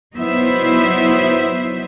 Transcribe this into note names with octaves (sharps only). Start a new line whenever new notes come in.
F#3 B3 D#4 E4 C5 E5